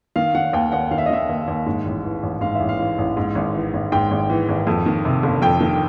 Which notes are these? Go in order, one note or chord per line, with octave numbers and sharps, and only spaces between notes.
D#3 F5
D#3 F#5
D#2 G5
D#2 F#5
D#3 F5
E5
D#5
D#3 E5
D#2
D#2
G#2
A1
E3
A1
G#2 F5
E5
A1
F5
E3
A1
G#2
G#1
E3
G#1
G#2 G5
G#1
E3
G#1
F2
D#3
C3
G1
F2 G5
D#3